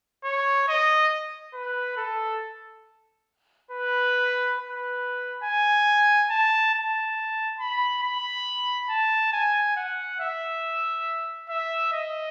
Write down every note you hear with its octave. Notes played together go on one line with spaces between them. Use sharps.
C#5
D#5
B4
A4
B4
B4
G#5
A5
A5
B5
B5
A5
G#5
F#5
E5
E5
D#5